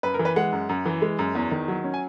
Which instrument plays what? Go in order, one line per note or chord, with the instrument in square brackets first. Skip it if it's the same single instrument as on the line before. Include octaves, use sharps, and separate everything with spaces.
[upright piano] F#2 B4
A#4
E3
B4
G#3 F#5
F#2
F#2
E3
G#3
F#2
E2
D#3
F#3
C#4
G#5